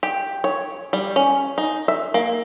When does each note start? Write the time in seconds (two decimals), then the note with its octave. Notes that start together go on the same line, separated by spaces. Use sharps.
0.03 G4
0.44 C#5
0.93 G3
1.16 C#4
1.58 D#4
1.88 E5
2.14 A#3